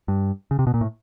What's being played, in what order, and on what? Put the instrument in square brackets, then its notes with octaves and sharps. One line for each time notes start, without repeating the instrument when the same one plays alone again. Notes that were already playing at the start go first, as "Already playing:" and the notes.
[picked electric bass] G2
C#3
C3
B2
A#2
A2